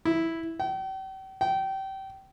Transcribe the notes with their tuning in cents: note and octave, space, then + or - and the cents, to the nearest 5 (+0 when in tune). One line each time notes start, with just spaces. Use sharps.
E4 -5
G5 -40
G5 -25